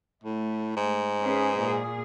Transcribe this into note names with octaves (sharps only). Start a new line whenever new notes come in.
A2 A3
G#2
C#4 G#4 B4
A#2 G#4